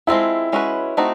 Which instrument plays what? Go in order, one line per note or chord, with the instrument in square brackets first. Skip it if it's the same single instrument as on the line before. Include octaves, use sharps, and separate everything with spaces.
[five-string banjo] G#3 C4 F4 A4 [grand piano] E4
[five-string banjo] G#3 C#4 F#4 B4
A3 C4 D#4 F#4